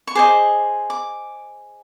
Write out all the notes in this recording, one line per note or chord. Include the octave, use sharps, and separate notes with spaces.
C#6
G#4 C5 D#5 D6
D6